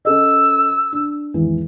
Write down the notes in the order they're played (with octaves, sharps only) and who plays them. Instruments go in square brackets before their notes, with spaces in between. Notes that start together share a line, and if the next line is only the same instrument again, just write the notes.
[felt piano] C#4 A4 D#5 [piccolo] E6
[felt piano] D4
G#1 E2 E3